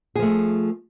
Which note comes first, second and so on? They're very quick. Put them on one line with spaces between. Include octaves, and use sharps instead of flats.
G#4 F3 A3